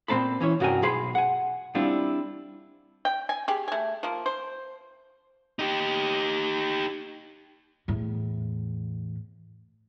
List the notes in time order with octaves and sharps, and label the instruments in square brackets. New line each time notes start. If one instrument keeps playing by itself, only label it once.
[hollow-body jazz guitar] A#2 C4 C5 A5 B5
E3 C#4 E4 C#5
C2 G2 F#4 A#4 G5 G#5
B1 G#4 B5 C6
F#5 G#5
G3 C4 D4 E4 F4
[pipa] G5
G#5
G4 G#4
A3 G#5
F3 A#3
C5
[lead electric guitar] D#4 G4
[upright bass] E2 A2